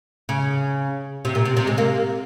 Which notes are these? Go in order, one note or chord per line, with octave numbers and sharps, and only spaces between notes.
C#3
C3
A#2
C3
C3
G#3
A#3